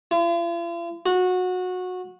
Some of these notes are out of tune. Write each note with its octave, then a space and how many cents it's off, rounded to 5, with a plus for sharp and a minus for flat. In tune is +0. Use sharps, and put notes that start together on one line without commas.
F4 -45
F#4 -20